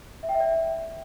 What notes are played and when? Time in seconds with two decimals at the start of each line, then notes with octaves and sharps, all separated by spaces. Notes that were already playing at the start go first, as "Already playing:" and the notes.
0.23 E5
0.29 G5
0.35 E5
0.40 D5